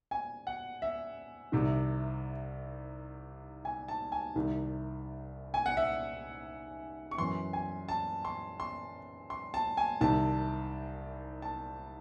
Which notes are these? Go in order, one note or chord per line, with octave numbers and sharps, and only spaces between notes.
G#5
F#5
E5
C2 C3 D#3
G#5
A5
G#5
C2 C3 D#3
G#5
F#5
E5
C#6
F#2 E3 C6
G#5
A5
C6
C6
C6
A5
G#5
C2 C3 D#3 A5
A5